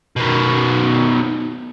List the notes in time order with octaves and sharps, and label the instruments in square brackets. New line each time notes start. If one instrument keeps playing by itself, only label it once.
[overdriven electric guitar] B2 D#3